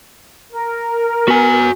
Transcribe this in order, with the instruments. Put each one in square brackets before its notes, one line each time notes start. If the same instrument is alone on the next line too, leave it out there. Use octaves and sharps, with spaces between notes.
[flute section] A#4
[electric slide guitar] B3 [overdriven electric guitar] F#4 G#5